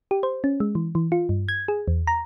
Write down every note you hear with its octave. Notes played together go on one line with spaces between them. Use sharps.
G4
C5
C#4
G#3
E3
E3
F4
G2
G#6
G#4
E2
A#5